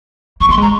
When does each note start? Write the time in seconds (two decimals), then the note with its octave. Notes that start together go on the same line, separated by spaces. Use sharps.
0.40 A#3 C#6
0.49 A3 C6
0.57 G#3
0.62 A#5